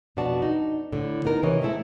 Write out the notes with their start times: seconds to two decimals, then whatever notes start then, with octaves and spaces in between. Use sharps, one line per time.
0.17 F2 B2 D4 F#4 D5 A5
0.42 D#4
0.92 A2 D3
1.25 B3 D#4 A#4
1.43 C3 E3 C#5 D#5
1.62 G#3 A3 C4 E4 A4